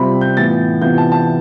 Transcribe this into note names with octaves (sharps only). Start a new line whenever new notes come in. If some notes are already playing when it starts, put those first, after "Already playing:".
Already playing: C3 G3 C4 F4 B5
G6
A2 E3 B3 F4 A6
C3 E3 B3 F4 G6
A5
A5